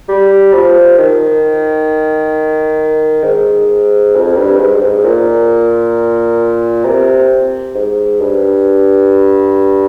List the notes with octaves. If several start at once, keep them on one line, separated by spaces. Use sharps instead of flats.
G3
F3
D#3
G#2
F2
G2
G#2
G2
G#2
A#2
C3
G#2
G2